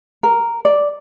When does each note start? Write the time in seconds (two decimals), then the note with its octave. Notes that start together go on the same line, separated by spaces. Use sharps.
0.23 A#4
0.65 D5